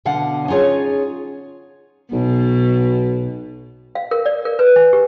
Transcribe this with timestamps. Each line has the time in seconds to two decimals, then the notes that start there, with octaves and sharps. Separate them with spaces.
0.05 B2 D3 F5 F#5
0.48 C#4 D#4 F4 G#4 C#5
2.12 B1 B2
3.95 F5
4.11 A#4
4.26 D5
4.45 A#4
4.59 B4
4.76 G#5
4.93 G4